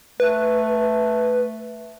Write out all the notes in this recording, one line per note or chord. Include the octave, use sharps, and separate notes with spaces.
A3 B4